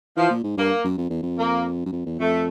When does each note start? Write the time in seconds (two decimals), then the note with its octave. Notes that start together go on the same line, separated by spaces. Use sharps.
0.17 E3 F3
0.31 A#2
0.44 G#2
0.57 G2 A#3
0.84 F#2
0.98 F2
1.10 E2
1.23 F2
1.38 A#3
1.86 F#2
1.92 F2
2.06 E2
2.19 F2 A3